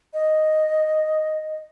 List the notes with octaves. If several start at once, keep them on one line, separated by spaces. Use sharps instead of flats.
D#5